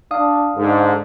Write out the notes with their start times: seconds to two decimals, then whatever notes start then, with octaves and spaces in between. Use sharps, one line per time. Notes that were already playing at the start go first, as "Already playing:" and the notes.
0.11 D4 F5 D#6
0.57 G#2 D3